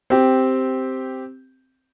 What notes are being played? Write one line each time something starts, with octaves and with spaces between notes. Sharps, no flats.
C4 G4